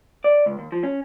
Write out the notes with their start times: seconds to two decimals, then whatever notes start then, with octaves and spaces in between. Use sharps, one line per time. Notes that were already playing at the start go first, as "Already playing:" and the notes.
0.24 D5
0.46 C#2
0.59 D#2
0.72 F3
0.84 C#4